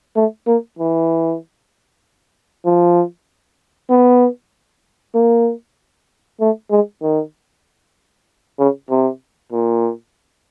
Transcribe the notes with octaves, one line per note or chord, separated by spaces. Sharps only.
A3
A#3
E3
F3
B3
A#3
A3
G#3
D#3
C#3
C3
A#2